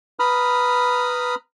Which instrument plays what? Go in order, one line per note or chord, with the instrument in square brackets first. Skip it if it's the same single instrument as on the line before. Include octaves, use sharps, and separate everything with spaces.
[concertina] B4 A#5 B5 D#6 F6